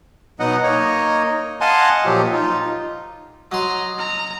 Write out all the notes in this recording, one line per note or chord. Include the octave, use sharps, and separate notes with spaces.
B2 F#3 B3 D#4 D#5 F#5
A#3 D#4 C#5 D#5
D#5 F5 F#5 G#5 A5 C6
A#2 F3 F#3 G4
D#4 F4
F#3 D#5 A#5 C6
A#5